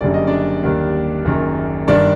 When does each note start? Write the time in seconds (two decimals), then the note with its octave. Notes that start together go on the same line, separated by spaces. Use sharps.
0.01 F#1 F#2 D3 G3 D5
0.14 D#5
0.27 D4 D5
0.63 D#2 D#3 G3
1.25 F#1 F#2 D#3
1.87 G1 G2 D#3 G3 D4 D5